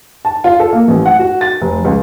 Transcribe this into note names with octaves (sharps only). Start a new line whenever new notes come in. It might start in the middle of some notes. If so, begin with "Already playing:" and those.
A5
F4
A4
A#3
A1
F#5
F#4
A6
F1
C#2